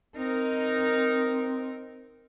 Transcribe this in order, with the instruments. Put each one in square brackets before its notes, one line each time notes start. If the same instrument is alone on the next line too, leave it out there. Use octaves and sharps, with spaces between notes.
[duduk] C4 [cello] D#4 A#4